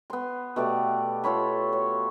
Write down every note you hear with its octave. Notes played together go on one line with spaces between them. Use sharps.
B3 C6
B2 A3 G4 D5
F4 A4 C#5 B5
C#5